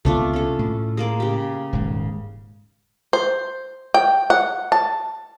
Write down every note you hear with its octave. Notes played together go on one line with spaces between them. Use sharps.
C#2 C3 A3 B3 D4 F4
C#4 A4
A2
G#3 A#3 D5
C#3 G4
D#1 G#2
C5
G5
F#5
A5